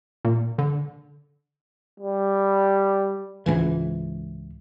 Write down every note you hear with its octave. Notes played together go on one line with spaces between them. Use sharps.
A#2
D3
G3
C#2 G#2 E3